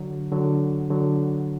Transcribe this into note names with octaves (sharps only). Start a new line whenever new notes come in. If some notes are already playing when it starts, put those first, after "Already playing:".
Already playing: D3 F#3
D3 F#3
D3 F#3